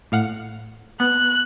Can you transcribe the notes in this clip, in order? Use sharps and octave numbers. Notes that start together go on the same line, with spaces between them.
A2 F5 F#5
B3 F#6